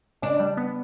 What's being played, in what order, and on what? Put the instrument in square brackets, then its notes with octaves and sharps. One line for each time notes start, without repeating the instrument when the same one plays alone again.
[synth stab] C#3 [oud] D4
[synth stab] G3
B3